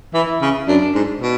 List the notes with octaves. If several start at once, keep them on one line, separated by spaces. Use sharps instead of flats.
E3 E4
C#3
F#2 D4
G#2
B2